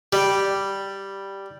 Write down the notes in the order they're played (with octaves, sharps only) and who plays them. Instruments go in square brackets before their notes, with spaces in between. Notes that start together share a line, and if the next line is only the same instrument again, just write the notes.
[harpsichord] G3